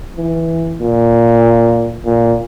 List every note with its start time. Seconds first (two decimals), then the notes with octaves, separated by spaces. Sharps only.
0.16 E3
0.80 A#2
2.05 A#2